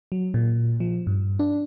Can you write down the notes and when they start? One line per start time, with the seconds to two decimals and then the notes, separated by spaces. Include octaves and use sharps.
0.12 F#3
0.34 A#2
0.80 F3
1.07 G2
1.39 D4